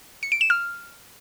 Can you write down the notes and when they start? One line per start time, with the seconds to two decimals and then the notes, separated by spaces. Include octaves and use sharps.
0.23 C#7
0.32 D7
0.41 E7
0.50 F6